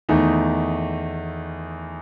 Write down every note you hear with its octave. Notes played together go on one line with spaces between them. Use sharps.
E2 D#3 A3 D#4